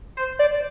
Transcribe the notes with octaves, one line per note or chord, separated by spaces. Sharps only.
C5
D5